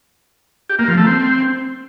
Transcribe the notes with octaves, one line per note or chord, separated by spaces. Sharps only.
G4
A#3
F3
A3
C4